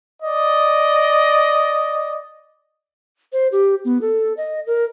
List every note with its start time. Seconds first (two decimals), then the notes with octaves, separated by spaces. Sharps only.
0.22 D5 D#5
3.33 C5
3.52 G4
3.85 B3
4.01 A4
4.37 D#5
4.67 A#4